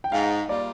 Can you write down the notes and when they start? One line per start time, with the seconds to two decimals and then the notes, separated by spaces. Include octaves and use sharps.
0.04 G5
0.12 G#2 F5
0.48 G3 A#3 F4 D5